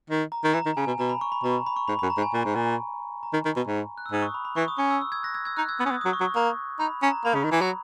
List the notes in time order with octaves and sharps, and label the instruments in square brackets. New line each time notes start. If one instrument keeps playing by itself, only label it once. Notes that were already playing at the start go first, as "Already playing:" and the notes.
[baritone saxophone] D#3
[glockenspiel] A#5
[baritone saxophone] D#3
[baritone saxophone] E3 [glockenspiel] A#5
[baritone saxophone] D#3
[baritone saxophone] C#3 [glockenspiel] G#5
[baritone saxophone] B2
[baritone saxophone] B2 [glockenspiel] A#5
[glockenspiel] B5
C#6
B5
[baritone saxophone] B2 [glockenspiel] A#5
[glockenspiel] B5
C#6
[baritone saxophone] G#2 [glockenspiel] B5
[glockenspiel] B5
[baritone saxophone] F#2
[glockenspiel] A#5
[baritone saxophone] G#2
[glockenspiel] G#5
[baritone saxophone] A#2
G#2
A#2
[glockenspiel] A#5
[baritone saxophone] D#3
D#3
B2
G#2
[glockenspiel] F#6
E6
[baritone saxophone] G#2 [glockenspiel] D#6
[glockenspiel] C#6
B5
B5
[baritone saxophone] E3 [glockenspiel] C#6
[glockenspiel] D#6
[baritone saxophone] C#4 [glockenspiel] C#6
[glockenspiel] E6
E6
E6 G#6
F#6 A#6
E6 G#6
E6 G#6
[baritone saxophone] D#4 [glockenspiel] F#6
[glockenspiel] E6 G#6
[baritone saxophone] B3 [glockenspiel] E6
[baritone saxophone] C#4 [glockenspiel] D#6
[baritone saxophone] B3 [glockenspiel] E6
[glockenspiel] D#6
[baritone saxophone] F#3
[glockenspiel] C#6
[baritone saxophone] F#3
[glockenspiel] C#6
[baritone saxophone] A#3 [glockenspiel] C#6
[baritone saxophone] D#4 [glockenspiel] B5
[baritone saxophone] C#4 [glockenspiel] A#5
[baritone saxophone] A#3 [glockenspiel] B5
[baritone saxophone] C#3
D#3
E3
F#3